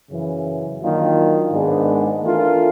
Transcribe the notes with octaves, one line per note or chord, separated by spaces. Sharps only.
F#2 C#3 E3
D#3 F#3 A#3 D4 F4
G#2 D#3 G#3 B3 D4
E3 A3 D4 F4 A#4